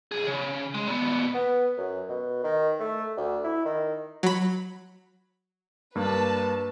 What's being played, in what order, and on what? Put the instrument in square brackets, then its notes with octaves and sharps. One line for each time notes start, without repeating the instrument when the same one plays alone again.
[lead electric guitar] B1 G#4
C#3
G#3
A#2 B3
[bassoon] B3
F#2
B2
D#3
A3
D2
E4
D#3
[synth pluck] F#3 B5
[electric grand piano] G2 A#3 D4 [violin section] B4 A5